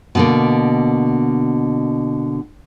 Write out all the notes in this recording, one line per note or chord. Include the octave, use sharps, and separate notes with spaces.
B2 D3 A#3